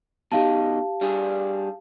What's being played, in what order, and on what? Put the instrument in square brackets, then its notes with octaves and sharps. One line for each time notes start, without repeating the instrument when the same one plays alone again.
[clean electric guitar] B2 D#3 D#4 [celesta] G4 F5 A5
[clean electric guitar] G3 D4 G#4